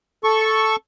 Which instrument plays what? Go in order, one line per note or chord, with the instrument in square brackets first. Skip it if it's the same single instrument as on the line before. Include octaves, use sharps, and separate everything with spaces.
[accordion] A4 C#6